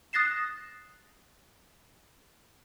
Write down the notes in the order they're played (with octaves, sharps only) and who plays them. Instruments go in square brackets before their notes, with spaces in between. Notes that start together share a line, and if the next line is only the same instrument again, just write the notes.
[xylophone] D#6 F#6 A6 A#6 C7 E7